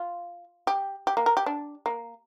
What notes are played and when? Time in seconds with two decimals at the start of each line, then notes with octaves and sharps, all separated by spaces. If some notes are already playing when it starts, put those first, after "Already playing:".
Already playing: F4
0.67 G4
1.07 G4
1.17 A#3
1.26 A#4
1.37 G4
1.46 D4
1.86 A#3